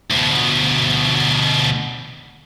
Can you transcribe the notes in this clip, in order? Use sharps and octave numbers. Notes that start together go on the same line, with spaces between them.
D2 B2